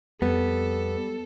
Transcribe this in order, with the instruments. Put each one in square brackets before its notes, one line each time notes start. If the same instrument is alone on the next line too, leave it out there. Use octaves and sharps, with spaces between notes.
[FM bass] F2 [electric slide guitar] G3 [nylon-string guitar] B3 [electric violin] A4